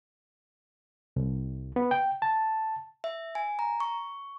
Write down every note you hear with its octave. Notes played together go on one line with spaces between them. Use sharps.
C2
B3
G5
A5
E5
G#5
A#5
C#6